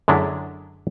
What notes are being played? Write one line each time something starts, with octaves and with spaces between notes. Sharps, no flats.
F#2 D3 F#3 G#3 D4 E4